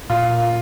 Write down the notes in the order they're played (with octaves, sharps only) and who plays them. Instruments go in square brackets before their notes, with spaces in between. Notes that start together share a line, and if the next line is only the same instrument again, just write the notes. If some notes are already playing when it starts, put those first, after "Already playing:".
[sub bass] A#2 [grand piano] F4